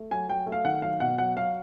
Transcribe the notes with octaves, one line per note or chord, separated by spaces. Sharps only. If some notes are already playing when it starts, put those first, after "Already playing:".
Already playing: A3
F#3 G#5
F#3 G5
A3
F5
D#3 F#5
F#3 F5
B2 F#5
F#3 F#5
F#3 F5